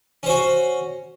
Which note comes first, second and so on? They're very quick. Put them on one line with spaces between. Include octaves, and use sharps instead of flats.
C#4 C5 F#4